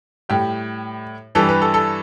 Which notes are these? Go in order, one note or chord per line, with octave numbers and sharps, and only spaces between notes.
A2 G3 G4
G2 E3 G3 A4
B4
A4
A4